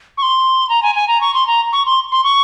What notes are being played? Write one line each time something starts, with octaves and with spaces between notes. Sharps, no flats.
C#6
C6
A#5
G#5
G#5
A#5
C#6
C6
A#5
C#6
C6
C6
C#6